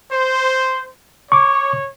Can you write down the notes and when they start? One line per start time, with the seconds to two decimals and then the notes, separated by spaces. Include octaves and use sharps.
0.11 C5
1.32 C#5 C#6 D6